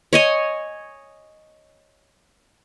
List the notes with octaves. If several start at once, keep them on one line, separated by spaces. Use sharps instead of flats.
C#5 D#5 G#5